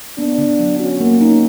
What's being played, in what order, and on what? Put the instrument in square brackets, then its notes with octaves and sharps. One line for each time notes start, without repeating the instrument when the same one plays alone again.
[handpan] B3 [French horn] D4
[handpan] D3
F#3
[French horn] C#4 [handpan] F#4
[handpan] A#3
D#4